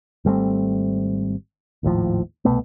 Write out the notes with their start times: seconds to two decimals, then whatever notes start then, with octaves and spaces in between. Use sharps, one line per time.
0.25 G#1 G3 A3 C4
1.83 G#1 D#2 A2 F3
2.45 C2 B2 A3 B3